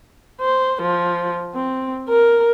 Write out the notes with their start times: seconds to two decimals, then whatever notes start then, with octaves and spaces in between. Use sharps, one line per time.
0.41 C5
0.82 F3
1.55 C4
2.09 A#4